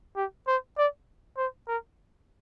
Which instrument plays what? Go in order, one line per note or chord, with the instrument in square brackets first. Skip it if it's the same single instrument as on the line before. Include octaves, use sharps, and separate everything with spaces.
[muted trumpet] G4
C5
D5
C5
A#4